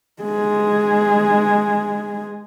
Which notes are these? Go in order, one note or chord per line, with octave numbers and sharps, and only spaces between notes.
G#3 G#4